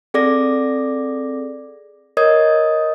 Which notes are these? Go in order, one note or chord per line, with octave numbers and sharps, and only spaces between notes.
C4 G#4 A4 D5 D6 A#6
A#4 C#5 D#5 D#6 G#6